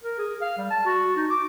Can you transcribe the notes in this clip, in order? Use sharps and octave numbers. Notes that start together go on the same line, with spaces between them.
A#4
G#4
F5
G3
A5
F#4
D#4
D6